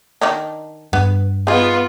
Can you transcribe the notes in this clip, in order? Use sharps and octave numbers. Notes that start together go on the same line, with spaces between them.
D#3 D4 D#4
G2 B3
B3 D#4 F4 G#4